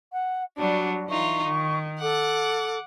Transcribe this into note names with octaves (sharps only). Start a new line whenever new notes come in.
F#5
F#3 G3 D4 F#4
E3 D#4 F4 C#6
D#3
A4 F#5 D6